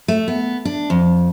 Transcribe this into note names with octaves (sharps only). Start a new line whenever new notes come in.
A3
B3
D4
F2